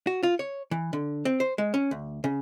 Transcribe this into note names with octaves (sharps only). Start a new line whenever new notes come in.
F#4
F4
C#5
E3
D3
C4
C5
G#3
C#4
D2
C#3